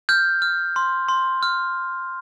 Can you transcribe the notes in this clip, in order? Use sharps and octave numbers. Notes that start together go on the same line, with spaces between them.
F6 G6
F6
C6
C6
F6